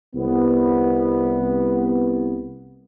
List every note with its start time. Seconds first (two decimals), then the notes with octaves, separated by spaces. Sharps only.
0.16 C2 B3